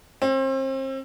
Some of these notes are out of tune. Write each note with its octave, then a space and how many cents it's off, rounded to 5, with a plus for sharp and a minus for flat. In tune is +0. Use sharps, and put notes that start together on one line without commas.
C4 +35